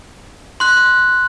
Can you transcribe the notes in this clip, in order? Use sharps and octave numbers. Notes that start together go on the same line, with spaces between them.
C6 F#6